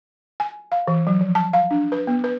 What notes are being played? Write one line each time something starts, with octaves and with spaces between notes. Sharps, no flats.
G#5
F5
E3
F#3
F3
A5
F5
D4
B4
B3
B4